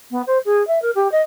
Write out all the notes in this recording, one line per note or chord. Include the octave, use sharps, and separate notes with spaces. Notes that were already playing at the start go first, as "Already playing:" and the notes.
B3
C5
G#4
E5
A#4
G4
D#5